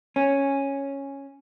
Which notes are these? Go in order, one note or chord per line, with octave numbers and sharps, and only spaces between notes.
C#4